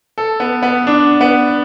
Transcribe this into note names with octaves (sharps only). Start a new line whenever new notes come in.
A4
B3
B3
D4
B3